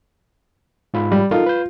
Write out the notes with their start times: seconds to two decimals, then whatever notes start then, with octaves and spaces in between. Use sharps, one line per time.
0.94 G#2 F4 B5
1.12 G3
1.31 D#4 F4 A4 A#4
1.46 B4 G6